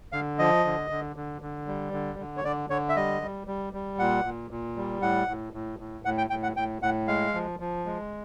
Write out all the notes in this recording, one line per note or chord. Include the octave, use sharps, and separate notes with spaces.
D3 F5
F3 D#5
D3
D3
D3
D3
G3
D3
D3
C#5
D3 D5
D3 C#5
E5
G3 D#5
G3
G3
G3
A#2 F#5
A#2
A#2
G3
A2 F#5
A2
A2
A2
A2 F#5
G5
A2 G5
F#5
A2 G5
A2 F#5
G#3 F5
F3
F3
G#3